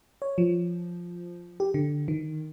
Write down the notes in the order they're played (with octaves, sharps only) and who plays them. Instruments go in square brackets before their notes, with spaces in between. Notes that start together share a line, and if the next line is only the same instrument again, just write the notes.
[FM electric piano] C#5
F3
G4
D3
D#3